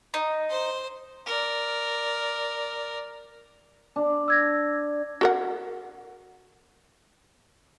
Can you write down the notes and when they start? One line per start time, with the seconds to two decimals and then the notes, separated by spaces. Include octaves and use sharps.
0.14 D#4
0.50 C5 C6
1.26 A#4 D5
3.96 D4
4.28 E6 G#6 A#6
5.21 F#4 A#4 F#5